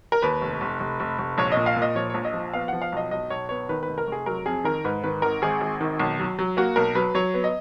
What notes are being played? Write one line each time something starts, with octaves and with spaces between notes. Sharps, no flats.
A#4
D#2 B4
F1
F1
F1
F1
F1
A#1 C#5
D#5
A#2
F5
A#2
D#5
F3 C#5
A#1 C#5
D#5
F3
B3 F5
F3 F#5
F5
B1 D#5
B1 D#5
B1 C#5
B3 C#5
D#3 B4
F1 B4
A#4
F1 G#4
F#3 A#4
F2 G#4
D#3 A#4
G#2 B4
D#3 B4
G#1 A#4
G#1 G#4
G#1
D#3
B1
F#3
F#3
A#3 F#4
B1 A#4
F#3 B4
F#3 C#5
B3
D#5